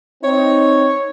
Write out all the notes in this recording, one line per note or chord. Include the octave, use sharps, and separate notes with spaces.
C4 D#4 C#5